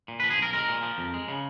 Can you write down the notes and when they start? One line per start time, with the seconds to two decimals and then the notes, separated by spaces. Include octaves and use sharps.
0.08 A#2
0.20 B4
0.23 F3
0.31 G#4
0.38 B1 A#4
0.53 G#3 A#4
0.68 A#2
0.83 F3
0.98 F2
1.14 G#3
1.28 C#3